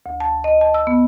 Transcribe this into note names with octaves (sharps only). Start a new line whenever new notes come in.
D2
A5
D#5
A5
E6
B3